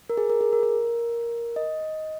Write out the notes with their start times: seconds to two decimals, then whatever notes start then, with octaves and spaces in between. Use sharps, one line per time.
0.10 A#4
0.17 G#4
0.30 A#4
0.41 G#4
0.53 A#4
0.63 A#4
1.56 D#5